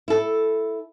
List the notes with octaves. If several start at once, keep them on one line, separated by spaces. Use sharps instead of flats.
E4 A4